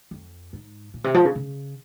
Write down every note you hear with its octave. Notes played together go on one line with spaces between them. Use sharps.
F2
G#2
A#2
C3
F3
C#3
C#3